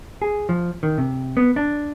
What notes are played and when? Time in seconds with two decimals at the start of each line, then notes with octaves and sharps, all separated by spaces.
0.22 G#4
0.49 F3
0.83 D#3
0.98 C3
1.37 B3
1.56 D4